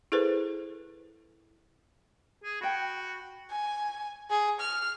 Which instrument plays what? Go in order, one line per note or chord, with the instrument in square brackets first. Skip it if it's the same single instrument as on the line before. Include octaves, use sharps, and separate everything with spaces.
[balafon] E4 G#4 A4 B4 C5
[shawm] G#4
[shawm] F#4 [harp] G5 B5
[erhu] G#5
G#4
F6